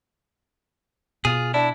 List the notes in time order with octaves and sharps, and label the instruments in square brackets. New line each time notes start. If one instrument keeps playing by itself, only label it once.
[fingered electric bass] B2 [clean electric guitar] F4 G#4
[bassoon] D4 [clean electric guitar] E4